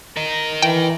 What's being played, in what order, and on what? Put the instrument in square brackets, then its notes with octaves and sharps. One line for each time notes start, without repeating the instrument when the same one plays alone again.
[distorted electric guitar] A#4 D#5
[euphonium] E3 [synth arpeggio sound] G5